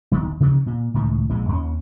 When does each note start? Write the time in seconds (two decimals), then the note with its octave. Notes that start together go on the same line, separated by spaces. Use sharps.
0.11 D#1 B1 D#3
0.40 C3 D#3 F3 C#4
0.66 A#2
0.94 C#2 A2 D#3
1.30 A#1 A#2 G#3
1.48 D#2 C#4